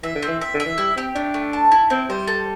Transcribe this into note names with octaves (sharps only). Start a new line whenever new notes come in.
E3 E5
D3
C4
E3
E5
D3
E5
E3
G3 E4
C4 G4
A3 D4
A3
A5
E4
C4 E4
G3 C5
A4